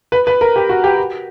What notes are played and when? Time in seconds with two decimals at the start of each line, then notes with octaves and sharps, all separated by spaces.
0.12 B4
0.27 B4
0.41 A#4
0.56 G4
0.69 F#4
0.84 G4
0.98 F#4